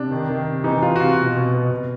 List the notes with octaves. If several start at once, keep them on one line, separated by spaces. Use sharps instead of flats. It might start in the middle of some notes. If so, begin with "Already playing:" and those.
Already playing: C3 D4
D#3
D#3
C3
E3 D#4
E3 F4
F#4
C3 F4
B2
B2
B2
B2